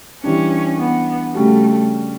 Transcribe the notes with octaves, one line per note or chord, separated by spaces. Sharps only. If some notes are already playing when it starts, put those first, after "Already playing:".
E3 G3 C#4 D4
B3
C#3 G3 A3 C#4 F#4